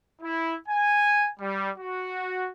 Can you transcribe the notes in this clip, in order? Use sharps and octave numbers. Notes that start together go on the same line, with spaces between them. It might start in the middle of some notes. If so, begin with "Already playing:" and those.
E4
G#5
G3
F#4